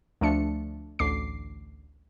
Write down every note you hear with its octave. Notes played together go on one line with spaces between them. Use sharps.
D2 F3 A3 D4 C#7
A1 D2 D6 C7